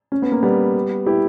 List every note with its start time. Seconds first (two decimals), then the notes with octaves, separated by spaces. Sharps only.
0.12 C#4
0.22 B3
0.32 A#3
0.43 G3 B3
1.06 E4 G4